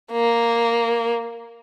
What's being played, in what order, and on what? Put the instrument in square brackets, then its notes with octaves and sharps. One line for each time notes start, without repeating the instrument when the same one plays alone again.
[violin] A#3